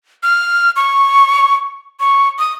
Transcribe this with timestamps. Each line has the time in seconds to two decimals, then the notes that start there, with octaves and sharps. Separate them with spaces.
0.23 F6
0.76 C#6
2.00 C#6
2.39 D#6